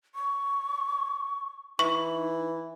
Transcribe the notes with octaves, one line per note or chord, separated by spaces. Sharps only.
C#6
E3 D#4 C#6